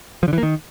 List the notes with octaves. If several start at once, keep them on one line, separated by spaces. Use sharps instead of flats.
F3
D3
E3
A#3
D#3